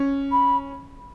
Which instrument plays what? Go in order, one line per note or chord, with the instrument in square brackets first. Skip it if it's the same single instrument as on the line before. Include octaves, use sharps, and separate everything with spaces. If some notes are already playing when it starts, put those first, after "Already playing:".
Already playing: [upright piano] C#4
[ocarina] B5